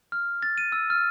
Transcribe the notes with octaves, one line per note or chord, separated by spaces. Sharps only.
F6
A6
D#7
E6
F6